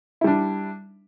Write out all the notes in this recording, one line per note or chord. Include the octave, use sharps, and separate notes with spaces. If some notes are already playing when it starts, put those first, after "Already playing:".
G3 D4 E4